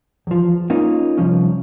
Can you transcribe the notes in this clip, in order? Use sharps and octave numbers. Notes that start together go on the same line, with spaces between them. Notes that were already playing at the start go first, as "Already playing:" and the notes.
E2 F3
A#3 C#4 D#4 F4
C2 G2 F3 C#4